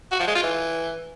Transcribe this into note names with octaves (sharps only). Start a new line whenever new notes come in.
F#4
F3
G#3
F4
E3